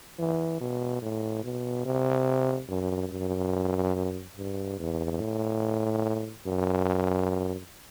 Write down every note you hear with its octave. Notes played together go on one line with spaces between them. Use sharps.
E3
B2
A2
B2
C3
F#2
F#2
G2
E2
A2
F#2